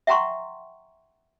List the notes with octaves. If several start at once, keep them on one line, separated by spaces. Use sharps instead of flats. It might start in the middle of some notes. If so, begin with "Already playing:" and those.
E5 F#5 G5 A#5 C6 C#6